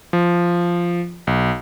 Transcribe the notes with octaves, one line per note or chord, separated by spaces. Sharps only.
F3
B1